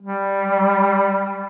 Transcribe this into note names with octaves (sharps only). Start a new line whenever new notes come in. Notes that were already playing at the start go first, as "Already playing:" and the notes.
G3